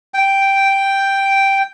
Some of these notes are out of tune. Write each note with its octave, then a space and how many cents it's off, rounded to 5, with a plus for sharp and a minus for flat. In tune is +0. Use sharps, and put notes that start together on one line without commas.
G5 +0